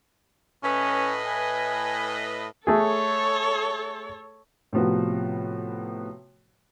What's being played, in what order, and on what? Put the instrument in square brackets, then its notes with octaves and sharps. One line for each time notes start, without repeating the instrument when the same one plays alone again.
[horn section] A2 B4 D#5 [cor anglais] C#4
[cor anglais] G#5
[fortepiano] A3 G#4 [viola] A4 C#5
[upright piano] A2 C3 F3 B3 F#4